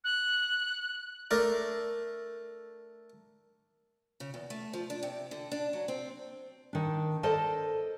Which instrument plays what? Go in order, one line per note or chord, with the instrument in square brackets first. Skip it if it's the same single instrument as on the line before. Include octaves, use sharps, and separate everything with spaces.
[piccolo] F#6
[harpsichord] A3 D4 A#4
[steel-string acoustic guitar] C#3
E2
A3
F3
D4
C3
D3
D4
F#3
C4
[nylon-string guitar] D#3 D4
A4 A#4 C5 D5 D#5 A5